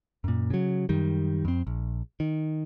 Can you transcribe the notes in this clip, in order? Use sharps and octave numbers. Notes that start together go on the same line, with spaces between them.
F#2 A#2
C#3 F#3
F#2 D#3 G3
F2 C4
A#1
D#3